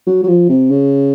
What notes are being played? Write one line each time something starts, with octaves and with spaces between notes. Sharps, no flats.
F#3
F#3
F3
C3
C#3